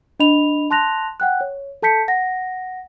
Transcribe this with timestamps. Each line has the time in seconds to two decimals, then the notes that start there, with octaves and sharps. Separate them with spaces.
0.20 D4 D#5 B5 F7
0.71 A5 C6 F#6 A#6 F7
1.20 F#5 G5 F#6
1.41 C#5
1.82 A4 A5 G6 B6 C#7
2.08 F#5 A#6